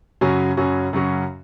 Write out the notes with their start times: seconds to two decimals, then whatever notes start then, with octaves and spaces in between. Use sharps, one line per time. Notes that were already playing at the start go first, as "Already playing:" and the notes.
0.21 F#2 C#3 F#3 C#4 F#4
0.57 F#2 C#3 F#3 C#4 F#4
0.93 F#2 C#3 F#3 C#4 F#4